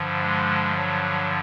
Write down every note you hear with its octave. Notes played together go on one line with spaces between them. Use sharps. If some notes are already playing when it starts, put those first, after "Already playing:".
Already playing: G2 D3 F3
G#3
F#3